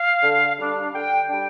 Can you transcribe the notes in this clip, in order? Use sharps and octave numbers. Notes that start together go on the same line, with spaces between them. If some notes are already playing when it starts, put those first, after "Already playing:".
Already playing: F5
D3
G3 D4
D3 G5
G3 D4 G5